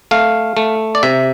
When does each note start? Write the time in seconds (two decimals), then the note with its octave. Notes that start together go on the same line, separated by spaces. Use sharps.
0.11 A3 F5
0.57 A3
0.95 D5
1.03 C3 E5